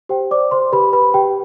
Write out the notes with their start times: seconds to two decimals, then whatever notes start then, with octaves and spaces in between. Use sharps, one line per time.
0.09 G4 C5 G5
0.31 C5 D5 D6
0.51 C5 C6
0.72 G4 B4 B5
0.93 B4 B5
1.14 G4 G5